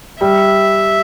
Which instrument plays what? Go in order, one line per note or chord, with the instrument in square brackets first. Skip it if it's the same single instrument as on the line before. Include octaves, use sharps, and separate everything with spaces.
[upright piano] G3 [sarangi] E5